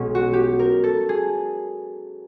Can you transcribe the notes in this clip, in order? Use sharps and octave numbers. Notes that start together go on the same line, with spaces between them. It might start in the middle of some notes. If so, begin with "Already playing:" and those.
Already playing: B1 B2 G#3 C#4
F#4
G4
A#4
A4
G#4